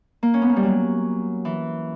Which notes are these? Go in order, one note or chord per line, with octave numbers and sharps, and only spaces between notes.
A#3
C#4
B3
A#3
G3
F#3
E3